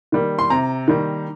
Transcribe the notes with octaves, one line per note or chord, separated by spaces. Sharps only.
D#3 G3 A#3
C6
C3 A#5
D#3 G3 A#3